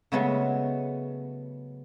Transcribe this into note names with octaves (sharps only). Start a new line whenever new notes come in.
C#3 F#3 G#3 A3 B3 C#4